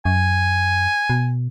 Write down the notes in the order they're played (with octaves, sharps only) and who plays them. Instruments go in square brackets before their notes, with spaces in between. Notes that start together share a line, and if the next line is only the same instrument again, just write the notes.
[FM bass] F#2 [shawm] G#5
[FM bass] B2